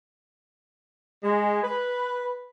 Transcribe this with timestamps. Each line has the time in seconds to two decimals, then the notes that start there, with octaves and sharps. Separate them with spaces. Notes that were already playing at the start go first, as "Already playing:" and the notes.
1.24 G#3
1.63 B4